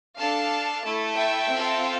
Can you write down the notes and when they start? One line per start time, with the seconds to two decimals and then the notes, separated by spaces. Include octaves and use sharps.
0.17 D4 A4 F5 A5
0.84 A3 E4 A4
1.18 E5 G5
1.53 C4 F4 A4